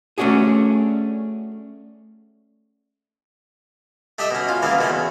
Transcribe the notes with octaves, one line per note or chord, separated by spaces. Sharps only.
A3 C#4 D4 F#4 G#4
A3 G4 D#5 E5
B2 C#4
F4
C#3 E3 A#3 B3
B2 A3 C#4
E2